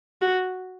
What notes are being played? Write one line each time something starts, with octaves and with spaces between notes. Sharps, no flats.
F#4